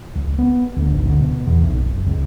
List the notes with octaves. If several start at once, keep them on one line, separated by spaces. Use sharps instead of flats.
C#2
B3
D2
G#1
D2
B2
E2
B1
F#1
C#2